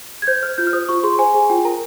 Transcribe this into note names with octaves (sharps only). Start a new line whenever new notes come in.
G#6
C5 G6
C5 F6
F4 G6
F6
C5 D#6
F4 C#6
G#4 C6
C5 G#5
G#4
F4 G5
A#4 A#5